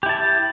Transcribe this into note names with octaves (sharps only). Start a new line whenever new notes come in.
E4 G4 A5